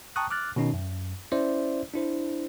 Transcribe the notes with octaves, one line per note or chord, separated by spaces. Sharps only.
G5 A5 A#5 C#6 D#6 F#6
D6 F6 F#6 A6
B2 D#3 C#4 D#4
F#2
C#4 E4 C5 D5 E5
D4 E4 C5